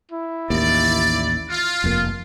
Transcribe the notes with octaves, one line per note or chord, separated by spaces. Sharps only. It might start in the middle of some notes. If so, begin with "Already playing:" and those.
E4
A1 D#2 D5
F4
F1 F2 A#3